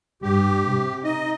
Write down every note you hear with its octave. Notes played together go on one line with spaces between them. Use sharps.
G2 G4
C3
D#4 D#5